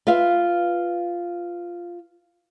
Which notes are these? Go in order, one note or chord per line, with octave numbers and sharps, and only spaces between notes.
F4 B4 E5 F5